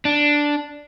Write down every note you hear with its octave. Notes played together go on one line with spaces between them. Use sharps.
D4